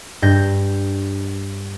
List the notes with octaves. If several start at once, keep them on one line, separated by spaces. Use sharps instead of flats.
G2 G6 A#6